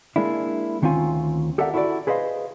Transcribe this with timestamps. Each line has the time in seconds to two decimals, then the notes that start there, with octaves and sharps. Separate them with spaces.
0.16 G#3 A#3 D4 E4
0.82 D2 D#3 C4 C#4 F4 G#5
1.58 G4 A4 A#4 D5 E5 F#5
1.74 E4 F#4 A4 B4 D5
2.07 G#4 B4 C5 D#5 F5